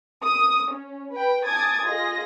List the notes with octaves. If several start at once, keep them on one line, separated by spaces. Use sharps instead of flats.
D#6
C#4
B4 G5
G#5 A5 D6 D#6 G#6 A6
F4 G#4 D#5 A#6